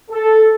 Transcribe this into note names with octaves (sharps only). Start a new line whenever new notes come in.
A4